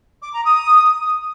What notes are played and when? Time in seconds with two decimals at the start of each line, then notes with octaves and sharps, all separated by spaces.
0.22 D6
0.33 A#5
0.45 D#6